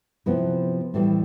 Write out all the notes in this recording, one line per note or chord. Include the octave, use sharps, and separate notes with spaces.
C3 F3 B3 E4 B4
A2 E3 G3